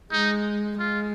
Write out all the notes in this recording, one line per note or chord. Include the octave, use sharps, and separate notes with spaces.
G#3 D#4
G#3 F4